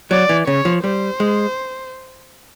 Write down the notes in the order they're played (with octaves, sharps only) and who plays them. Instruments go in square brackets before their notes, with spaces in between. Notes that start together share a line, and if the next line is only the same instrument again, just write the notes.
[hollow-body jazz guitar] F#3 [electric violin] D5
[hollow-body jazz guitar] E3
[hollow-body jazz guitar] C#3 [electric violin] C#5
[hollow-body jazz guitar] F3
[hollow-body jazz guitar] G3 [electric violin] C5
[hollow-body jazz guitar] G#3